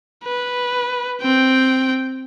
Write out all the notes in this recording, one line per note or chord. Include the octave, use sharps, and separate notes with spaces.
B4
C4 G5